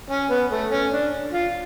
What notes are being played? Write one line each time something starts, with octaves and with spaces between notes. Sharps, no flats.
C#4
B3
A3
C#4
D4
F4